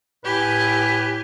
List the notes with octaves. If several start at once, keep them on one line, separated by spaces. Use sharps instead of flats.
A2 G4 B4 G#5